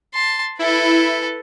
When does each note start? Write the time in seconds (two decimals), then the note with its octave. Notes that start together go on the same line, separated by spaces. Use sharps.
0.14 A5 C6
0.59 E4 A4 B4